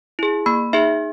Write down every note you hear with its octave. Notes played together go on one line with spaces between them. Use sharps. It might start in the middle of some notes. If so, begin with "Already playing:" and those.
E4 G#4
A#3 B5
D#4 G#4 E5